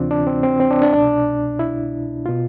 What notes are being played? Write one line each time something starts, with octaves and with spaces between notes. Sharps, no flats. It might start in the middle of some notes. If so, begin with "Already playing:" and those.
Already playing: D2 C3 E3 C4 D4 F4
D4
C4
C4
C4
D4
D4
C2 B2 D4
E4
B2 F4